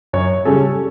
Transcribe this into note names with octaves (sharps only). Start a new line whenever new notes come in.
F#2 C#5
C#3 G3 C#4 A4